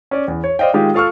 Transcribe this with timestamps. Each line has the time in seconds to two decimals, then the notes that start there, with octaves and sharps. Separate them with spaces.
0.11 C#4 D5
0.28 E2
0.44 C#5
0.59 C5 D5 D#5 F5 G5
0.74 D#3 G#3 F4 G4
0.94 F4 A4 F5 C#6 E6 F6